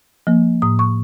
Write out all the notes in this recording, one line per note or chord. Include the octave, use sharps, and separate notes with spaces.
F3 A#3
A2 D#6
C#6